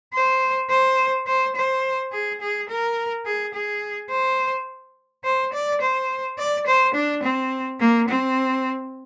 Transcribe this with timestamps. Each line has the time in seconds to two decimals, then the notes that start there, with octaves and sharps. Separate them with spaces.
0.13 C5
0.69 C5
1.27 C5
1.56 C5
2.12 G#4
2.41 G#4
2.69 A#4
3.26 G#4
3.54 G#4
4.10 C5
5.24 C5
5.53 D5
5.81 C5
6.38 D5
6.67 C5
6.94 D4
7.23 C4
7.80 A#3
8.08 C4